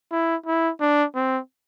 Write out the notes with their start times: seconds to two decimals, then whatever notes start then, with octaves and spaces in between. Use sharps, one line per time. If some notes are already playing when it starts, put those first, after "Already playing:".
0.12 E4
0.46 E4
0.80 D4
1.15 C4